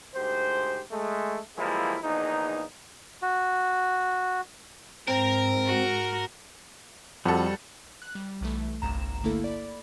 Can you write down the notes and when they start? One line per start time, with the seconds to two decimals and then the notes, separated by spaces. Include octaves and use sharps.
0.14 D2 G#2 G4 C5
0.91 G#3 A3
1.57 E3 F3 G3 G#3 A#3 E4
2.03 A#1 E2 A#3 D#4
3.22 F#4
5.08 G#2 C4 A#4
5.66 F#4
7.26 F2 G3 F#4 A4
8.02 F#6
8.15 G3
8.41 B1 E3 A3
8.81 G1 C2 G2 A#5 E7
9.23 D3 A3 A#3 E4 A4
9.44 D5 B5